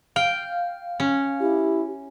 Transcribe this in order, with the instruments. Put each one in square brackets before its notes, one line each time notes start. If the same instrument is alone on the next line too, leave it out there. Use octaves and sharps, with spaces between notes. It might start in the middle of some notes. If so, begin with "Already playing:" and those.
[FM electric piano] F5 [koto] G5
[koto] C#4
[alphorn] E4 [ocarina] G4